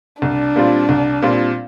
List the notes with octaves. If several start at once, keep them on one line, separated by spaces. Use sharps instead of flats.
C2 D4
A#2 G3 C4 F4
C2
A#2 G3 C4 F4